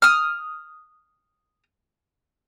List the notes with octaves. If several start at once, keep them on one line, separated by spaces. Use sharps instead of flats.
D#6 F6